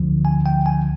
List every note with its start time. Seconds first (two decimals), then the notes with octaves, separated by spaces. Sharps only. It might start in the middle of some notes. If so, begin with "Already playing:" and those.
Already playing: D2 D3 F3
0.25 G#5
0.46 G5
0.66 G#5